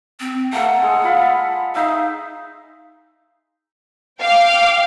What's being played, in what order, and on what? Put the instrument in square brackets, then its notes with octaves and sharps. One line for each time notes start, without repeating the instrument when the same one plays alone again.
[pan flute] C4
[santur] A3 A#3 A4 [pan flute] F#5
[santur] G#3 G#4 A4
F4 F5 B5
[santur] D#4 E5 [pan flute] F5
[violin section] F5 G5 D6